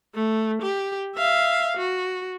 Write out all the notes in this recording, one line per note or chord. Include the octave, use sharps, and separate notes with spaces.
A3
G4
E5 F5
F#4